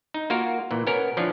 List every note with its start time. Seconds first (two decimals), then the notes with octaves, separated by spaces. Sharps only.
0.14 D#4
0.30 A#3 F4 F#4 A#4
0.71 A#2 E3
0.86 B2 B3 C#4 A#4
1.17 E3 F3 C#4 D4